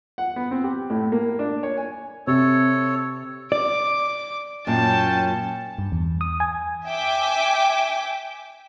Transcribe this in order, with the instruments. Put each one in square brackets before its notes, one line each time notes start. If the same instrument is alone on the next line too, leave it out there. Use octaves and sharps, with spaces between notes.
[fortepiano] F#5
B3
C4
G4
A2
A#3
D4
C#5
G#5
[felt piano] C3 [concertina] A4 C#5
[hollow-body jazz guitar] D5 [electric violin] D6
[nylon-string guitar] F#2 A#2 [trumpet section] C#4 G5 [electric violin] A5
[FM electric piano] G2
E2
D#6
G#5
[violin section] E5 G5 G#5 D6